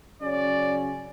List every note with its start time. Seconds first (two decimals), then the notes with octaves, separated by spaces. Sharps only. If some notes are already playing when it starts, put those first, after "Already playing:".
0.22 C#3 F#3 C#4 D5